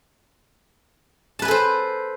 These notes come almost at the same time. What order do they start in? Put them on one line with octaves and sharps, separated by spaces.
A5 B4 G#5 A4 C5